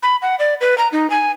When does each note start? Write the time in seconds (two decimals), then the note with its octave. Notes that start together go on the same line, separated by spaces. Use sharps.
0.03 B5
0.22 F#5
0.39 D5
0.61 B4
0.78 A#5
0.92 D#4
1.10 G#5